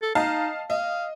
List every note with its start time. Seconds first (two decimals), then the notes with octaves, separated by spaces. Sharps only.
0.02 A4
0.15 D#4 D#5 F5 A5
0.70 D#5 F5